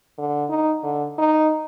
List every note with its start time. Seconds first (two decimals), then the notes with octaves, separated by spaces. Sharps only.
0.18 D3
0.49 D#4
0.83 D3
1.18 D#4